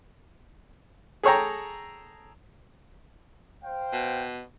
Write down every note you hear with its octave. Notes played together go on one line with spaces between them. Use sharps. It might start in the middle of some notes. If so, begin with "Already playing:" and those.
G#4 A4 C#5 G5 A#5
C5 F5 G5
B2